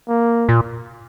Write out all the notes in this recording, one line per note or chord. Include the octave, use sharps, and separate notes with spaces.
A#3
A#2